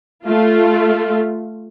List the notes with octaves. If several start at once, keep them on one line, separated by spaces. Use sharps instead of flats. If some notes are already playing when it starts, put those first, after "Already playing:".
A3 F4